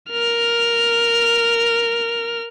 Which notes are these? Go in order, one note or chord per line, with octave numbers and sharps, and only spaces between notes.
A#4 F6